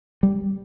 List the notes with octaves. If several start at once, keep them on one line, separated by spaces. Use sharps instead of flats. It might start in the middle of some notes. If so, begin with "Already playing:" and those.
G3